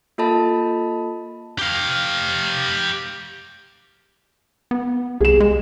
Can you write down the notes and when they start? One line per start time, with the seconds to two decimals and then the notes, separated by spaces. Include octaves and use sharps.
0.18 A#3 F4 A4 D#5 A5 B5
1.59 G4 F5
4.71 B3
5.21 C2 G#4 E7
5.40 G#3